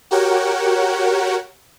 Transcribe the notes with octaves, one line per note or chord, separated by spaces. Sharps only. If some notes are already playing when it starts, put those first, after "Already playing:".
F#4 G4 A#4 C#5 F#5 G5